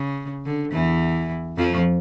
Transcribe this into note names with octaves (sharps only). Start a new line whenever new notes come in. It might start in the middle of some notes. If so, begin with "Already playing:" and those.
Already playing: C#3
D3
E2 E3
F2 F3